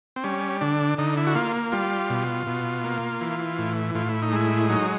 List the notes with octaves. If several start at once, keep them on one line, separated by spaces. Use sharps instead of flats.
C4
G3 C#4
D3 D4
D3 D#4
E4
F#4
A#3 F4
G3 F4
B2
B2
A#3
E3
A2
A2 F4
E4
D#4
G#3 E4
F#3 D#4